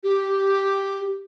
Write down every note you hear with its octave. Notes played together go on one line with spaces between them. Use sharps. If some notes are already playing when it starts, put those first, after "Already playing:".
G4